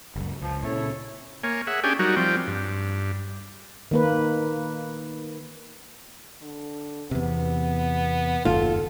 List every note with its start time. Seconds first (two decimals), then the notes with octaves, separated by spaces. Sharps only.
0.15 F#1 C#2 F#2
0.41 C#2 F3
0.63 A#2 C#3 E4 A4 C#5
1.44 A#3 C#5 G#5
1.67 G#4 E5 F#5
1.84 C#4 D4 G4 G#4 G5 G#5
1.99 F#3 G3 D#4 F#4 A#4
2.17 F3 G3 C4 G5
2.47 G2
3.91 D#3 A#3 B4
6.42 D3
7.11 E2 C3 B3
8.45 F#1 D#2 F4 A4